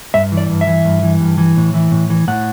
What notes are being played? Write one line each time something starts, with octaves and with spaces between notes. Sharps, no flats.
G2 E5
E3
D5
G2
E5
E3
G2
E3
G2
E3
A2
E3
A2
E3
A2 F#5